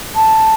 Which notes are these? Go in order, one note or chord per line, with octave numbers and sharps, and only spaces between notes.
A5